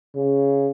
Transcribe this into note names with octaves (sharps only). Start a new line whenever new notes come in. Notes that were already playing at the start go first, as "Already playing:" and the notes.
C#3